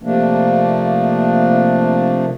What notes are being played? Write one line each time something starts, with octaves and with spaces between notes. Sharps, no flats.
C3 F3 A3 A#3 D4